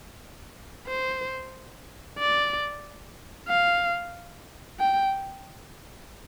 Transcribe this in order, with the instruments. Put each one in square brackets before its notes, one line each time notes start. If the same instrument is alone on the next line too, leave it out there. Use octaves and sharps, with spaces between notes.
[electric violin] C5
D5
F5
G5